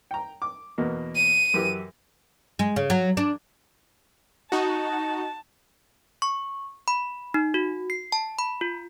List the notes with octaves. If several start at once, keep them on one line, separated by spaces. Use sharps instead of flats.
G5 A#5
D6
E2 B2 A#3
D#7
F#2 E3 G4
G#3
C#3
F#3
D4
D#4 F#4 A5
C#6
B5
D#4
F#4
C7
A5
B5
F4